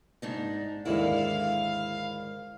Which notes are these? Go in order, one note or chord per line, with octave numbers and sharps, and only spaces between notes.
G#2 D4 D#4
D#2 G#2 D3 E4 F5